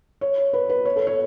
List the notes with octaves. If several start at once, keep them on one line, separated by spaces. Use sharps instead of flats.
C#5
B4
B4
C#5
A4
C#5